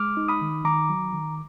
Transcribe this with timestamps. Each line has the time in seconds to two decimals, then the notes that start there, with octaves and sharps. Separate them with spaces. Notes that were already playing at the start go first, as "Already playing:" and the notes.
Already playing: G#3 D6 F6
0.17 D#4
0.28 B5 D#6
0.41 D#3
0.65 D#3 A#5 D6
0.89 F#3
1.13 D#3